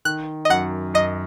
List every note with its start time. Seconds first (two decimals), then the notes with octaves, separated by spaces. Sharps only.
0.05 D#3 F#6
0.45 D#5
0.50 F#2 F#5
0.94 F#2 D#5